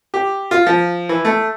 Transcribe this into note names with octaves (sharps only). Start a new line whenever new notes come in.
G4
F4
F3
E3
A3